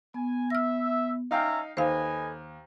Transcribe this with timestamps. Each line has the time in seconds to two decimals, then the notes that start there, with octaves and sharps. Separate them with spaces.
0.14 B3 G#5
0.50 E5 F6 A#6
1.31 C#4 D#4 E5 F5 G5 A#5
1.77 D#2 A4 B4 C5 D#5 F5 G#5